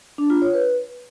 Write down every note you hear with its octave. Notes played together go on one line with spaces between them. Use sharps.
D4
F4
C#5
B4